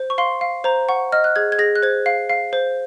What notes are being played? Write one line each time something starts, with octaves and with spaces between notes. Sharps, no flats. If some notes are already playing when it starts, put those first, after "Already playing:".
Already playing: C5
C#6
F5 C6
F5
C5 A#5
F#5 C#6
D#5 F6
F#6
G#4 G#6
G#6
G#4 A#6
F#6
C5 G#6
F5
F5
C5